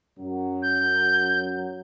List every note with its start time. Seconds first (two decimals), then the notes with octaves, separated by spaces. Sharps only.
0.18 F#2 F#3
0.62 G6